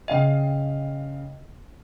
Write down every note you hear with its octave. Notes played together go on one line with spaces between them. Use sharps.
C#3 D#5 F5 G5 D#7